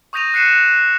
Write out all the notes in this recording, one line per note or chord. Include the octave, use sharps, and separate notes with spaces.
C#6 D#6 G6 A#6 D#7 F7
F#6 C7 C#7 D#7 E7